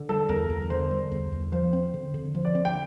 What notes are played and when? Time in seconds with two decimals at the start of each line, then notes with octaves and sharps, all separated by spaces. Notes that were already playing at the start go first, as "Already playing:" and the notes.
Already playing: D3
0.09 G3 A4
0.29 E2 A#4
0.50 E2
0.70 D3 C5
0.91 G3
1.12 E2
1.32 E2
1.52 F3 C5
1.73 C4
1.94 D3
2.14 D3
2.35 F3 C5
2.45 D5
2.55 C4
2.65 G5